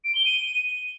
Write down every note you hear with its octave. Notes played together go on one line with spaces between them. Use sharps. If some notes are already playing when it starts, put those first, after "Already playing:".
D7
G7
D#7